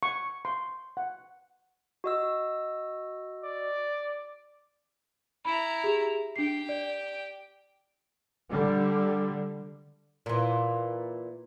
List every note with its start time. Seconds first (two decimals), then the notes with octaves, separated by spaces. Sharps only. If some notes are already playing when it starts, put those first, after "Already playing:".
0.03 C#6
0.45 C6
0.97 F#5
2.04 F#4 D#5 E6
3.44 D5
5.45 E4 A#5 B5
5.84 G4 G#4
6.36 D4 G4 G5 C7
6.69 D5
8.49 D3 G3
10.26 A#2 E3